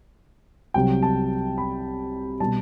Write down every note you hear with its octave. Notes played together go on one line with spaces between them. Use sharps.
C2 C3 F#3 G5
A5
B5
B2 G3 A5